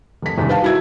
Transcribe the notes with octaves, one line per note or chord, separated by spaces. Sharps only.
F1 B6
G1 E2 C3 D#3
B4 F5 A5
F#3 E4 G#6